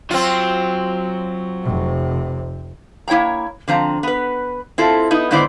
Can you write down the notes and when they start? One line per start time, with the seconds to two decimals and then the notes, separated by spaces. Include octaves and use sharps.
0.11 F#3 C4 F4
1.63 F1 C3
3.08 A#3 E4 C#5 G5 A#5
3.68 D3 F3 C4 A#5
4.03 B3 B4
4.78 C4 E4 F4 A4
5.11 B3 D#4 E4
5.31 G#2 D3 B3 E4 C5 D5